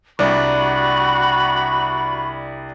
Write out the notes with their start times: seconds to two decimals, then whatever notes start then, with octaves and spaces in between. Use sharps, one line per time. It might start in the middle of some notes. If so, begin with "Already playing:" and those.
0.19 C2 D4 F#4 B5 C#6